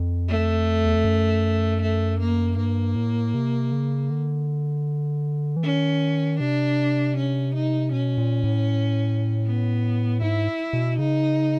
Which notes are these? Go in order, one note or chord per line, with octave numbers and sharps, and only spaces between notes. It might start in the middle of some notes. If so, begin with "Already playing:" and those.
Already playing: F2
A3
E2
F2
F#2
A3
A#3
G2 A#3
A2
C3
C#3
D3
E3
D#3 C#4
C3 D4
C#4
D#4
B2 C#4
A#2
A2
B3
G#2 E4
B2
C#3 D#4